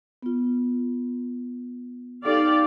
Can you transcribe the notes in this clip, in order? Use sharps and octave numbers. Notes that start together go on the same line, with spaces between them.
B3 F4
D#4 G4 A4 D5 F5